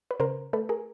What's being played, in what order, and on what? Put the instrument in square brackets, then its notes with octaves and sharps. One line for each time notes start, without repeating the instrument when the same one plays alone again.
[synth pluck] B4
C#3 A#4 C5
A3 A4 B4
G#4 A#4